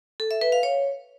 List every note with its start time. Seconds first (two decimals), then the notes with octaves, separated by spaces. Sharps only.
0.20 A4
0.31 E5
0.41 B4
0.52 F5
0.63 C#5